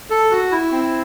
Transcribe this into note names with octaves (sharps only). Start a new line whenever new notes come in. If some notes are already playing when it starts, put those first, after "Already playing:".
A4
F#4
E4
C4